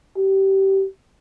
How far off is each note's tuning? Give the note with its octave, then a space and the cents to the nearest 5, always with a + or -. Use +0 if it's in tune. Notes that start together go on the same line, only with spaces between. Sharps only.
G4 -20